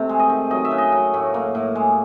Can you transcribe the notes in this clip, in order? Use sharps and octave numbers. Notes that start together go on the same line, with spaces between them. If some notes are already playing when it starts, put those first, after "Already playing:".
Already playing: C3 A3 C4
G#3
D#5
D#3
F#3 D#5
E5
C#3
D#5
F#3
A2
A#3
A2
G#3